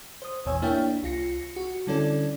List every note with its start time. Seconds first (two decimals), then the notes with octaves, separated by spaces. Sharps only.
0.22 C5 D#6
0.45 A1 E2 B2 C#5 G#5 E6
0.62 A#3 D4 E4 C#5 E5 G5
1.03 C2 F4 A#6 C#7
1.56 F#4
1.87 D3 G3 C#4 E4 A4 D5